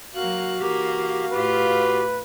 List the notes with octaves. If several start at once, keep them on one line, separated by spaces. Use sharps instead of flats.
F#3 A#3 F#4 F5 F#6
E3 A#3 G4
A2 F4 G4 B4